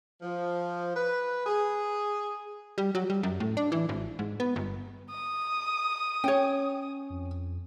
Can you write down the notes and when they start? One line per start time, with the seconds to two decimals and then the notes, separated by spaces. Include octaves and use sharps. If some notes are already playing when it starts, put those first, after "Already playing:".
0.21 F3
0.95 B4
1.46 G#4
2.78 G3
2.95 F#3
3.10 G3
3.23 F#2
3.40 A2
3.57 D4
3.72 E3
3.89 G#1
4.19 G#2
4.40 B3
4.56 G1
5.10 D#6
6.24 C#4 C#5 G5
7.10 F2